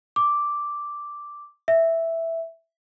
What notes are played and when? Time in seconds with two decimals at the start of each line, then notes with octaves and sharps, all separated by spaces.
0.16 D6
1.68 E5